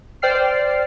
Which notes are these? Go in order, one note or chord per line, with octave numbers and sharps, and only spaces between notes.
C5 D5 G5 F6 C7